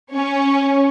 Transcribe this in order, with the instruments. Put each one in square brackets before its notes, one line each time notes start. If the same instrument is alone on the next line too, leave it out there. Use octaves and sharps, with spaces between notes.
[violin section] C#4 C#5